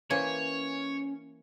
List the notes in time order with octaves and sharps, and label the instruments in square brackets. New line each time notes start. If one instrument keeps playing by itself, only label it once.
[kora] E3 A#3 C5 [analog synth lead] C#4 [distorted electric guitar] C#5 [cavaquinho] G#5